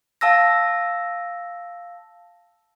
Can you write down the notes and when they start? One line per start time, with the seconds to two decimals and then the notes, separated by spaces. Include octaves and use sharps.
0.21 F5 A5 E6 A#6